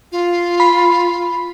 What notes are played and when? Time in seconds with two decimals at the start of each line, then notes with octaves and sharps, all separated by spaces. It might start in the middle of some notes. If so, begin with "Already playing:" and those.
0.12 F4
0.60 B5